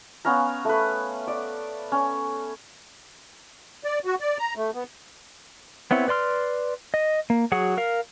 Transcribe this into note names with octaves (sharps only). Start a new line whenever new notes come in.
B3 C#4 F5 A#5
A3 B4
D5
C#4
D5
F#4
D5
A#5
A3
B3
B3 C4 E4 C#5
B4 D5 C6 F6
D#5
A#3
F#3 F#4 G#4 F#5
A#4 F5